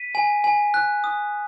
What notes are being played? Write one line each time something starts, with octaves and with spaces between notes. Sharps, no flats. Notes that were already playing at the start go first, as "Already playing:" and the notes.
Already playing: B6 D#7
G#5
G#5
F#6
D#6